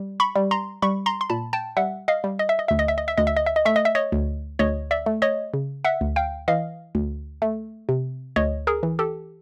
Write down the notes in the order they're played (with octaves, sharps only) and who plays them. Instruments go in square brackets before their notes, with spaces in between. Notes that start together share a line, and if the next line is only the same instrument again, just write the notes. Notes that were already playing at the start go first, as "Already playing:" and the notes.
Already playing: [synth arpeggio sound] G3
B5 C#6
G3
A#5 C6
G3 B5 C#6
A#5 C6
C6
A#2 A5 B5
G5 A5
G3 E5 F#5
D#5 F5
G3
D#5
E5
D#5
D2 E5
D#5
E5
D#5
E5
D2 D#5
E5
D#5
E5
D#5
A3 E5
D#5
E5
C#5 D#5
D2
D2 C#5 D#5
D5 E5
A3
C#5 D#5
C#3
E5 F#5
D2
F5 G5
E3 D#5 F5
D2
A3
C3
D2 C#5 D#5
G#4 A#4
E3
G4 A4